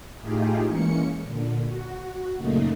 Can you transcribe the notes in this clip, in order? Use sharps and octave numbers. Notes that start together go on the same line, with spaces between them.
A2 A3 D#4 F4 G4 G#4
E3 G#3 A#3 C#4 C#7
A#2 D3
F#4
F#2 A#2 C#3 A3 A#3 D#4